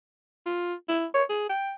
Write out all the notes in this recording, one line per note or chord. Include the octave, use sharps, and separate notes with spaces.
F4
E4
C#5
G#4
G5